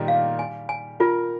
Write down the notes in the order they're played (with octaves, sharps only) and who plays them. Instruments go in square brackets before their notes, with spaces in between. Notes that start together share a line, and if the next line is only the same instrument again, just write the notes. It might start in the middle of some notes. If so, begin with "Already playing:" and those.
Already playing: [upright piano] A#2 D#3 G3 A#3 D#4 G4
[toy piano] F5
G#5
G#5
[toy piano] F4 [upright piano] A#4